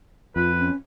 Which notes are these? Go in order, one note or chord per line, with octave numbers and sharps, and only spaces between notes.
F2 F4 B4
C#4